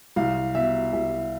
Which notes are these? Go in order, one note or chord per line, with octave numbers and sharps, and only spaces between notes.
C2 F5
B2 E5
C2 E5